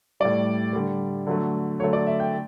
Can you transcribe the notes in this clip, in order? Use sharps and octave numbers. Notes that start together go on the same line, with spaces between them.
A2 G3 D5
D3 G3
D3 F#3 A3
D3 F#3 A3 C#5
D5
E5
G5